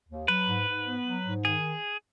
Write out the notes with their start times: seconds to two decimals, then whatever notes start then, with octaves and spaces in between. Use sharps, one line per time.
0.09 D#2
0.28 F#3 B4
0.47 G#2
0.68 G#2
0.87 B3
1.05 F#3
1.26 G#2
1.44 D#3 G#4